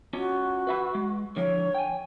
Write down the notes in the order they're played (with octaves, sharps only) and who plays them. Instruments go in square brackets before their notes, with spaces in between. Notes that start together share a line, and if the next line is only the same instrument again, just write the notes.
[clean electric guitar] C#4 F4 C#5 [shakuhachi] F#4
[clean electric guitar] B4 E5 B5
G#3
[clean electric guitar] D3 F3 E4 [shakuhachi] C#5
[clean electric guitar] G5 G#5